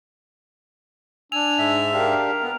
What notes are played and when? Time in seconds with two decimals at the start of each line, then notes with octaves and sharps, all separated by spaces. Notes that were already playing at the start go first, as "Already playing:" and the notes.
1.32 D4 G#5 E6 F7
1.58 G#2 E5
1.93 D4 G4 A#4 F5
2.43 B3